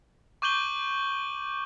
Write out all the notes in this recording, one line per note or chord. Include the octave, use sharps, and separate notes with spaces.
C#6 D6 G6 D#7 F#7 G7